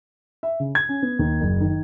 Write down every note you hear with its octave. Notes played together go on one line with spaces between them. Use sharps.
E5
C#3
G#6
C#4
B3
D#2
F#1
D#3